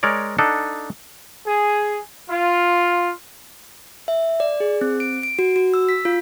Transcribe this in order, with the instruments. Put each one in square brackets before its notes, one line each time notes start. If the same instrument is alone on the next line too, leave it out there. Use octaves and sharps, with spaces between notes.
[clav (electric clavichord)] G#3 A#4 C#5 D5
D4 D#4 A4 F#5
[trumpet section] G#4
F4
[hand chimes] E5
D5
G#4
C4
D7
D7
F#4
F#4
E6
B6
F4